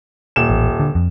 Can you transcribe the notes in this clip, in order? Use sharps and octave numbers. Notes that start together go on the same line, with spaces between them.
D#1 E7
A1
D3
F2